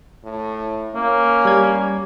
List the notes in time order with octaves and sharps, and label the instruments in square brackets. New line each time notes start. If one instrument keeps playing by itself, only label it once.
[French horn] A2
[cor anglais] A#3 [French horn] C#4
[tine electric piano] G3 G#6